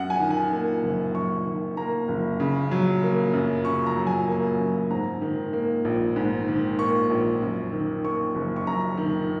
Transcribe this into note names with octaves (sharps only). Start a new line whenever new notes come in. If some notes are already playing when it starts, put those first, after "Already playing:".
Already playing: F#2 F#5
G#5
D#3
G#5
A#3
F#1
F#2 C#6
D#3
A#3 A#5
F#1
C#3
F#3
A#3
F#2
C#3 C#6
A#5
F#3
G#5
A#3
F#2
G#2 A#5
D#3
A#3
A#1
G#2
D#3
A#3 C#6
A#1
F#2
D#3
A#3 C#6
F#1
C#6
F#2 A#5
D#3